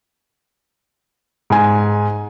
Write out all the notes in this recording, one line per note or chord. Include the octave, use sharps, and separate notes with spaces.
G#2 G#5